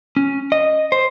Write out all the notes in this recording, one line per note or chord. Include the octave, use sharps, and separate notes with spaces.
C#4
D#5
C5